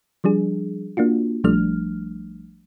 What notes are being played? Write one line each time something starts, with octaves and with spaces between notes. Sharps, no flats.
F3 G3 D4 G#4
A#3 D4 F4 F#4
A#1 F3 G3 A3 D4 F6